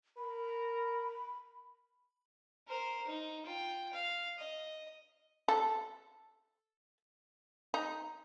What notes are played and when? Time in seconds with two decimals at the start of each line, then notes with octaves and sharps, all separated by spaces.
0.17 A#4 B5
2.68 A#4 C5
3.07 D#4
3.47 F4 G5
3.93 F5
4.38 D#5
5.48 A4
7.74 D#4